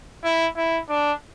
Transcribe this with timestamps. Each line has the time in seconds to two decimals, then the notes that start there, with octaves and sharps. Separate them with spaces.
0.24 E4
0.56 E4
0.89 D4